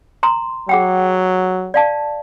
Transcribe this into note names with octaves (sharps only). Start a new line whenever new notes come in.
A#5 C6
F#3 G#4 F#5 G5
D5 F5 A5